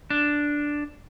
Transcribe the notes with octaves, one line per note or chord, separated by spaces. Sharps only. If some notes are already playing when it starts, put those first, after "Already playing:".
D4